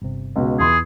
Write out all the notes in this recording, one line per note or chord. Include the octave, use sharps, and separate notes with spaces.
G1 C3
C#2 B2
E2 E3 B3 G#4 B5 C6